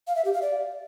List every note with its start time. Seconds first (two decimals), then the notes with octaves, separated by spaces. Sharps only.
0.07 F5
0.16 E5
0.25 G4
0.33 F5
0.42 D5